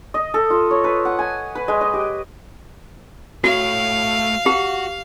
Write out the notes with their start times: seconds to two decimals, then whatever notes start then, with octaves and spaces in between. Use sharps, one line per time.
0.14 D#5
0.34 A4
0.50 F4
0.71 C#5
0.84 B4
1.05 F#5
1.19 G#5
1.55 B4
1.68 G#3
1.81 D#5
1.93 G4
3.44 A3 F#4 C#5 F5
4.46 F#4 G4